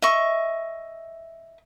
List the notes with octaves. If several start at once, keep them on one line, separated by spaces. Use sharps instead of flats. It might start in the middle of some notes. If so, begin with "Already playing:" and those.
D#5 E5 C#6